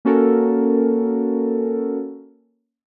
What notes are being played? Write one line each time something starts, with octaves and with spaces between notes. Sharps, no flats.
A#3 C#4 F#4 A4 A#4